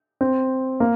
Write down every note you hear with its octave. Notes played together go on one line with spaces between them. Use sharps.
C4
A#3